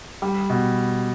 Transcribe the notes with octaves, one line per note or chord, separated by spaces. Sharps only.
G3
B2